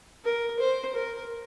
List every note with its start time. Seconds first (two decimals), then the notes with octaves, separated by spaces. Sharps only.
0.25 A#4
0.59 C5
0.95 A#4